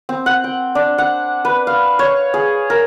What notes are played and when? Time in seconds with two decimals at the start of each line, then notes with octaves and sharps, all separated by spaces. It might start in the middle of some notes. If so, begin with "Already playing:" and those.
0.09 C4
0.26 F#5
0.44 G5
0.75 D4
0.98 F#5
1.45 B4
1.67 F5
1.99 C#5
2.34 G#4
2.70 A#4